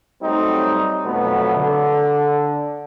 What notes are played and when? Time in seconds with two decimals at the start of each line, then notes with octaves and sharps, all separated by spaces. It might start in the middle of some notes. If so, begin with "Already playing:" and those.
0.22 F#3 G3 A3 C4 D#4
1.05 F2 B2 F#3 A3 B3
1.56 D3